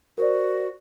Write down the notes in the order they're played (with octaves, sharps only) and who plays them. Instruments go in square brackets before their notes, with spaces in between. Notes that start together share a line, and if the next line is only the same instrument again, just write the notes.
[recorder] F#4 [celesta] A#4 C5 D5